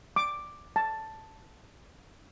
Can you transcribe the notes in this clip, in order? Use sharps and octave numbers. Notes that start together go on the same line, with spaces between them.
D6
A5